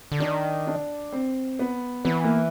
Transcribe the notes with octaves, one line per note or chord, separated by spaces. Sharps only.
D3
D#3 D4
D4
C4
B3
E3 B3
A#3